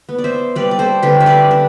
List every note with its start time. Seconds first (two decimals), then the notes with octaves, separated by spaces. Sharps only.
0.09 B3
0.18 D5
0.24 C5 E5
0.56 G3 B4 D5
0.71 D5
0.79 A4 C5
1.03 D3 G4 B4
1.20 E5
1.26 B4 D5
1.51 D4